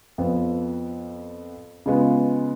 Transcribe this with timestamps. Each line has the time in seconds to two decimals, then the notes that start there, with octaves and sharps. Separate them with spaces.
0.18 F2 F3 B3
1.86 C#3 G#3 B3 F4